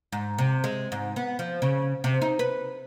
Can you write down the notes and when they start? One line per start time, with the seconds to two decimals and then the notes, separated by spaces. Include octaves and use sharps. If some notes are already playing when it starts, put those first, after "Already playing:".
0.12 G#2
0.38 C3
0.64 G#3
0.92 G#2
1.16 B3
1.39 F3
1.62 C#3
2.04 C3
2.22 D#4
2.39 B4